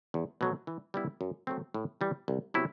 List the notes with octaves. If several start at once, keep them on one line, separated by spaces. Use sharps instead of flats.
E2
B2 F#3 A3
E3
G3 B3 E4
F#2
F#3 A3 C4
A2
E3 G3
C2
C3 F#3 B3 E4